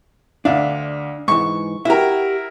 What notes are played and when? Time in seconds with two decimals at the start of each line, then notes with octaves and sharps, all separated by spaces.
0.45 D2 D4 E5 F5
1.28 G#2 E3 C#6
1.85 E4 F#4 G4 A#4 E5